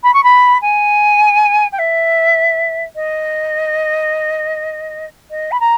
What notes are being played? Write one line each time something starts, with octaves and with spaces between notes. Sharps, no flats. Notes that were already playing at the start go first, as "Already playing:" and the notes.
B5
C#6
B5
G#5
G5
E5
D#5
D#5
B5
A#5